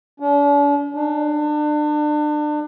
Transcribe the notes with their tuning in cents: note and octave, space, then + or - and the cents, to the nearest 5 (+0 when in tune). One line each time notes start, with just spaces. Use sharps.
D4 -45
D4 +30